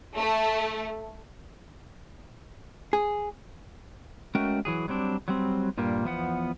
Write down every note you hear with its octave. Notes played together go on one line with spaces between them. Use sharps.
A3
G#4
G#3 A3 C#4 F#4 A#4 G5
E3 F#3 G#4
F#3 G3 C4 D4
F#3 G3 C4
G2 A#2 G3 A#3
E2 F3 B3 F#5